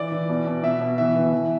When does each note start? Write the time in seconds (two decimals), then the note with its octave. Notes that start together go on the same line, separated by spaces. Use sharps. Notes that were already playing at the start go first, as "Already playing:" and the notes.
Already playing: E3 D5
0.12 E3
0.29 B2
0.47 B2
0.63 B2 E5
0.81 B2
0.98 E3 E5
1.15 E3
1.33 E3